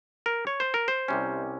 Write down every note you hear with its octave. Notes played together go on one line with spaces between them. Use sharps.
A#4
C#5
C5
A#4
C5
C2 C3 G3 C#4